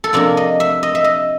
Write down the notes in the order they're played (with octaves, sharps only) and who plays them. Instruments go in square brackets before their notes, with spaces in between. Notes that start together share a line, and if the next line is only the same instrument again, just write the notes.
[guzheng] A4
C3 F3 A#3 D4 A#4
D#5
E5
D#5
E5
D#5